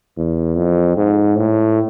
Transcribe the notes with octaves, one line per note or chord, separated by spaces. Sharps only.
E2
F2
G#2
A2